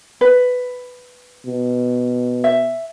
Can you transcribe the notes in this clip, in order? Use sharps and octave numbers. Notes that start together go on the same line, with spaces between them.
B4
B2
E5